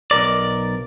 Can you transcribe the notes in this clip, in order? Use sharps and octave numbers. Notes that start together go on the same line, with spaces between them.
B1 E2 A#4 D5